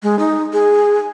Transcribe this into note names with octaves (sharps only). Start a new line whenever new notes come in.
G#3
D#4
G#4